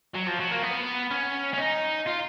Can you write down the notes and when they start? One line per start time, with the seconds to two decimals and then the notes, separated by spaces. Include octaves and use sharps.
0.15 F#3
0.28 F3
0.40 F#3
0.51 A#3
0.63 B3
1.11 C#4
1.54 C#4
1.58 D#4
2.06 F4